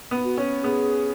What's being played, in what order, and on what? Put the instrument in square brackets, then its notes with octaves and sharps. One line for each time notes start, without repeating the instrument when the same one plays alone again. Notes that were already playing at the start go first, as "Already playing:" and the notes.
[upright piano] B3
[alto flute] F#4
[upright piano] C#4
[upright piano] B3 [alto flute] G#4